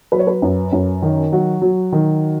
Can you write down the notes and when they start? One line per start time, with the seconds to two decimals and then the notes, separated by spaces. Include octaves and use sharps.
0.12 F#3 B4
0.19 C#5
0.27 B4
0.42 F#2
0.72 F#2
1.02 D#3
1.32 F#3 F#4
1.62 F#3
1.92 D#3